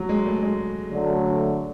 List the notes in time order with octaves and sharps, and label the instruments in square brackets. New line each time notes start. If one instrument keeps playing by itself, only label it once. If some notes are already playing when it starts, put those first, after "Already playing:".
Already playing: [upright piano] F#3
G#3
A3
G#3
[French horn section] D3 F#3 A3
[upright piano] D4